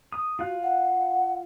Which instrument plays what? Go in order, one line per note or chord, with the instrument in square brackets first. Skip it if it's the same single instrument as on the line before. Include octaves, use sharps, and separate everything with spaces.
[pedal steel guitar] D#6
[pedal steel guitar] F4 F5 F#6 [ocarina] F#4
[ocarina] F#5